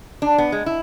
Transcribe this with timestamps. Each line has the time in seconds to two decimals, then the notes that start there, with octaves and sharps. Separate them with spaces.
0.22 D4
0.38 B3
0.52 G#3
0.66 E4